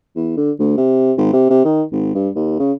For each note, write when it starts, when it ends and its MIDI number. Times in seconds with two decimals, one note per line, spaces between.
0.16 0.33 40
0.37 0.51 50
0.59 0.75 38
0.77 1.12 48
1.17 1.28 32
1.33 1.50 48
1.50 1.63 48
1.65 1.83 51
1.92 2.11 32
2.15 2.29 43
2.35 2.56 39
2.59 2.73 49